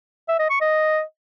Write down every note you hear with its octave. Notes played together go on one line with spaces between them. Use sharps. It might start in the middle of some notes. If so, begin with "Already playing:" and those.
E5
D#5
C#6
D#5